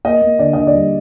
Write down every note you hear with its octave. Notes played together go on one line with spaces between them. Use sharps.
A#3 D#5
A#3
D3 D5
D3 D#5
D5
G3